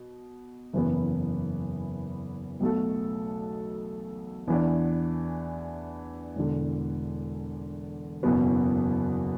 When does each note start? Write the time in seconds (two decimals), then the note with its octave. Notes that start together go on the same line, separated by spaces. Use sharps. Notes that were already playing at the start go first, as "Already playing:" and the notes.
Already playing: B2
0.73 F#1 E2 E3 B3
2.60 B1 B2 A3 F#4 A4
4.47 E2 E3 D4
6.36 E1 E2 D3
8.23 F#1 E2 B2 B3 F#4